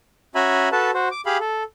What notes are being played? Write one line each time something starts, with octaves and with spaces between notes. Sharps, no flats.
C#4 F#4 E5 G#5 A#5 B5
F#4 A4 B4 A5
F#4 C5
D6
G4 G#4 F5 B5
A4